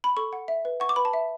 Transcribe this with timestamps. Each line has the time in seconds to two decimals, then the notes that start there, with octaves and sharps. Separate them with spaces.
0.04 B5
0.17 A4 C#6
0.33 F#5
0.48 E5
0.65 B4
0.80 F#5 C#6
0.89 D6
0.96 B4 B5
1.05 A5
1.13 E5